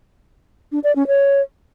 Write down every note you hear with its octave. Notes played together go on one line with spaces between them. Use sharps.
D4
D5
C#4
C#5